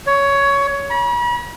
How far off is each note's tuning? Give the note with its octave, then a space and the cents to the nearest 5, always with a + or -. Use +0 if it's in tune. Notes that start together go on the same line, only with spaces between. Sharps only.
C#5 +15
B5 -45